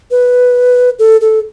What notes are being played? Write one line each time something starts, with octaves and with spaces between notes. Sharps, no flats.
B4
A4
A4